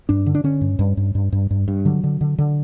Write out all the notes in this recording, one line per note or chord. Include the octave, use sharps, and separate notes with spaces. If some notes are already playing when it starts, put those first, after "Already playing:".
G2 D4
D3
D4
D3 C#4
G2
G2
G2
G2
G2
G2
G2
D3 F#3
D3
D3
D3